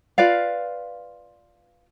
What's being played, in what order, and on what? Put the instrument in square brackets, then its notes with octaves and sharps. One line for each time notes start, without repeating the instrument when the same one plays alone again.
[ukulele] F4 B4 D5 F5